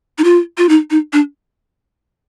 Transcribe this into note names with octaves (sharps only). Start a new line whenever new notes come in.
D#4
F4
F4
D#4
D#4
D4